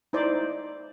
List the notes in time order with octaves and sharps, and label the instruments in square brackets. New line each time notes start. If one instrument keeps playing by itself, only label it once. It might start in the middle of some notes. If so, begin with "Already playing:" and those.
[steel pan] D#4 E4 C5 D5